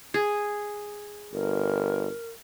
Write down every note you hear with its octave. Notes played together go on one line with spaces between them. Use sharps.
G#4
G1 A#4